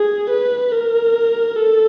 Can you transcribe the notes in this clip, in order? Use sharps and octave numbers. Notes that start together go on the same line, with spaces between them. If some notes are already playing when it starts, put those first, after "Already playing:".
Already playing: G#4
B4
A#4
A4